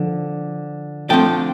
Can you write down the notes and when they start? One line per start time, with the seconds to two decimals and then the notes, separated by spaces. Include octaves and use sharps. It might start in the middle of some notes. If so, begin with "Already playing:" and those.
Already playing: D3 F3
1.09 D3 F3 A3 C4 G5 A5